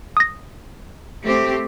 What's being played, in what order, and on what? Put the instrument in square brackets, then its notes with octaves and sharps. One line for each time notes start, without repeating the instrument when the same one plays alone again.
[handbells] D#6 A#6
[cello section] A3 C4 G4